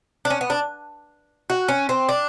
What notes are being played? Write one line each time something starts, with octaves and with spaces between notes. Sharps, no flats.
D4
C#4
B3
D4
F#4
C#4
C4
D4